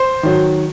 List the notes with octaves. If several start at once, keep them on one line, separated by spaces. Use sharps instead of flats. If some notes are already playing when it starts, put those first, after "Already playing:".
Already playing: C5
D#3 F#3